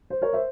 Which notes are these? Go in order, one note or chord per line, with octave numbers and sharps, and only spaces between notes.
C5
A#4 C#5
C5 E5